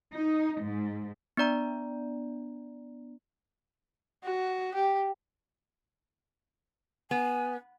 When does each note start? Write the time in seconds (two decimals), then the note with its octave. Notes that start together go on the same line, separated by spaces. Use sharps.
0.13 D#4
0.61 G#2
1.37 B3 D4 D5 A#5
4.24 F#4
4.74 G4
7.11 B3 G#5